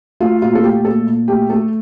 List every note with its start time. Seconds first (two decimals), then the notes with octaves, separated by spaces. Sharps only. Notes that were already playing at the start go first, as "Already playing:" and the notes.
0.20 A3 F4
0.42 A#2 F4
0.55 A4
0.63 A3 G4
0.85 A#2 A4
1.07 A#2
1.28 A3 G4
1.50 A3 A4